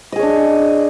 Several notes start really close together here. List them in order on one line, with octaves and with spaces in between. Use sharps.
D#5 G#4 C#5 D4